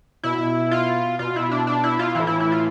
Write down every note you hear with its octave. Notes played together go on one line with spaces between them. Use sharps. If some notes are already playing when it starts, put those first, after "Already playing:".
B2 E4
F4
B2 F4
E4
D4
D4
E4
F4
A2 E3 E4
E4
E4
F4